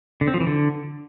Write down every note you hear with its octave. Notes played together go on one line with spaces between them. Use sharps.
D3
C4
F3
E3
D3